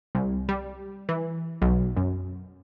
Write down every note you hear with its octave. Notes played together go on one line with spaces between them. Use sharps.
C2
G3
E3
B1
F#2